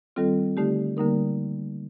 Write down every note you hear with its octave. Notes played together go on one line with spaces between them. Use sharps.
D#3 G3 C4 F4 A4
D3 A3 D#4 G4
D3 G3 A#3 D#4 A#4